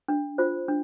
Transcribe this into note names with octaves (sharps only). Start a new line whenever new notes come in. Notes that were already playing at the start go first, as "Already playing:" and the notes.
D4
F4 C5
D4